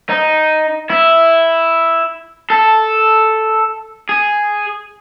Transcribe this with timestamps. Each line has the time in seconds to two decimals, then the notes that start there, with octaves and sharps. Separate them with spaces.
0.09 D#4
0.90 E4
2.50 A4
4.09 G#4